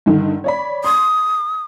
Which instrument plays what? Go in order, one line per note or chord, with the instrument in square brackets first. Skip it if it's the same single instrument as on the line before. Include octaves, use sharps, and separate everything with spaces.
[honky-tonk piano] G2 D3 D#3
C#5 D5 B5
[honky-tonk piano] C6 [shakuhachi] D#6